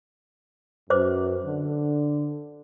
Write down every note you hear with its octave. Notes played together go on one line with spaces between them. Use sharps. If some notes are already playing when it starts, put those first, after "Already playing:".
F#2 B4 C5 D6
D3